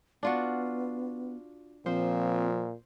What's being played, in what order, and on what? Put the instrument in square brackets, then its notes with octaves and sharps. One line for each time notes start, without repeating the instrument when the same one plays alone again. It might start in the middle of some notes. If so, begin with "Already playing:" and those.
[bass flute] B3 [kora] D4 F4 F#4
[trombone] A#2 [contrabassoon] F3 [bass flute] C4 [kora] C5